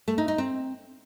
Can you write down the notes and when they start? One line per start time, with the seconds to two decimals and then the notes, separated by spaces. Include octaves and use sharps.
0.08 A3
0.18 D#4
0.28 D#4
0.38 C4